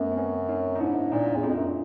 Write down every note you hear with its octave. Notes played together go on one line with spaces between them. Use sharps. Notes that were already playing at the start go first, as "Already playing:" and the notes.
Already playing: F#2 A3 B3
C4
B3 C#4
C#4 D#4
D#4
G#2 D4 E4
A#2 D#4 F4
E2
F2 D#4 F4
F#2